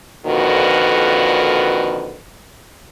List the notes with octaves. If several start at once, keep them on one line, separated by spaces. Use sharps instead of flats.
F2 A#2 D3 D#3 F#4 B4